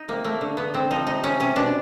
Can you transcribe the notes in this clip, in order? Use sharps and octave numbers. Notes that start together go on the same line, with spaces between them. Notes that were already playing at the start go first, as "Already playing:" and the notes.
Already playing: D#4
C3 A#3
A3 A#3
D3
D3 B3
D3 C4
F3 D#4
C3 D#4
C3 C#4
C3 C#4
B2 D4